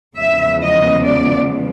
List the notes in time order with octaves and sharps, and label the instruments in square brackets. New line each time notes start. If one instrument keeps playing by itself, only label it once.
[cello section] E2 C#3 F3 G#3 B3 E5
D#5
D5